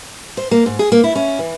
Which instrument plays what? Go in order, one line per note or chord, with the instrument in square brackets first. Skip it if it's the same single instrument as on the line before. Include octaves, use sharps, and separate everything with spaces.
[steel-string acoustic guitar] C5
A#3
G#2
G#4
A#3
E4
C#4
E3